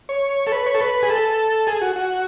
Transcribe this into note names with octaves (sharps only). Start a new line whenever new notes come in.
C#5
A4
B4
C#5
A4
B4
G#4
A4
G#4
F#4
F#4